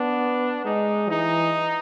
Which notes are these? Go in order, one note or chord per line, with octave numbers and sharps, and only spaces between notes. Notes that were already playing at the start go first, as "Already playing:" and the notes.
Already playing: B3 D4
G#3 D#4
E3 D#4